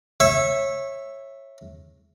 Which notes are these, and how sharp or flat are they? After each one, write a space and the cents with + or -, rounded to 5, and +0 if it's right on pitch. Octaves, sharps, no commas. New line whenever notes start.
C#5 -20 E5 +0